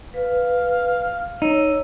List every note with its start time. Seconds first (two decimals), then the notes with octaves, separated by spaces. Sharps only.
0.14 B4 F5
1.42 D#4 C#5 E6